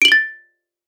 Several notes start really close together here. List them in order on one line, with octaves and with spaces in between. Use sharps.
D7 F#7 G7 A6